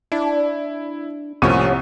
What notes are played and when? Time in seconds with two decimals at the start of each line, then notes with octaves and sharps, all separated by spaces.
0.12 D4 E4
1.42 C2 A2 F3 A#3 C#4 C#6 D#7